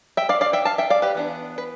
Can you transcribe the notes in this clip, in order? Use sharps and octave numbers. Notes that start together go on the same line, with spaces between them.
E5 G5
D5 F5
D5 F5
E5 G5
F5 A5
E5 G5
D5 F5
G4 B4
E3 B3 D4
B4